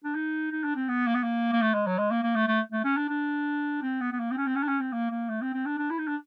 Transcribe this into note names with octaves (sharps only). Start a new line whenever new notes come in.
D4
D#4
D#4
D4
C4
B3
A#3
B3
A#3
A#3
A3
G#3
F#3
G#3
A#3
A#3
A3
A3
A3
C#4
D4
D4
C4
B3
B3
A#3
C4
C#4
C4
C#4
D4
C#4
C4
A#3
A#3
A3
C4
C4
D4
D4
E4
D#4
D4